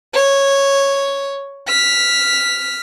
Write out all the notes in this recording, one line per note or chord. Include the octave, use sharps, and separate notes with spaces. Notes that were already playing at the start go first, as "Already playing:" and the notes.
C#5
F6 B6